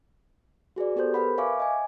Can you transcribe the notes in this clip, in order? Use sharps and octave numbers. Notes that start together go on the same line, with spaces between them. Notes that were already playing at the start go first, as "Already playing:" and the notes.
F#4 G#4 B4 D5
B3 G4 A4 C5 G6
A#4 B4 F#5 B5
C#5 E5 F5 G#5 C#6 D6
D#5 G#5